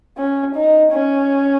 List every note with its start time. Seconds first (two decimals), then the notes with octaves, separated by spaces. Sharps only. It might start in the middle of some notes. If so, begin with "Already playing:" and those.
0.17 C#4
0.55 D#4
0.93 C#4